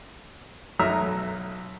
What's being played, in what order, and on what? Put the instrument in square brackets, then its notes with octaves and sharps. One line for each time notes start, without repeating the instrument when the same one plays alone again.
[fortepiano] B1 F#3 E5 A#5 E6 F6